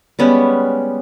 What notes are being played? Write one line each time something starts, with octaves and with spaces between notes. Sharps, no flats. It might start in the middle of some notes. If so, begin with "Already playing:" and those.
G3 G#3 B3 C#4